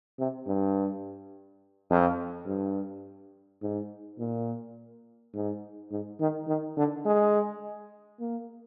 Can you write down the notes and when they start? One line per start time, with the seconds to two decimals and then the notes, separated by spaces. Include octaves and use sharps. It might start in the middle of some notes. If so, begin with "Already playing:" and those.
0.19 C3
0.47 G2
1.90 F2
2.47 G2
3.62 G#2
4.19 A#2
5.34 G#2
5.91 G#2
6.20 D#3
6.47 D#3
6.77 D3
7.05 G#3
8.20 A#3